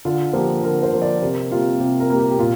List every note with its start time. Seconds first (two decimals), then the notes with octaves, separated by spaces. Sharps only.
0.05 D3 F4
0.33 F3 A#3 G4
0.63 D3 A#4
0.83 C5
0.92 F3 A#3
1.02 D5
1.22 C3 A#4
1.51 G3 A#3 F4
1.80 C3 G4
2.00 A#4
2.10 G3 A#3
2.19 G4
2.31 G4
2.38 A#2 F4